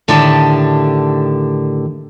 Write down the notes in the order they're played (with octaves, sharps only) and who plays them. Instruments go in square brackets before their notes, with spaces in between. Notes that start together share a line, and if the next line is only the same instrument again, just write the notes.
[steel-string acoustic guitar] A2 D3 D#3 G4 D5 A5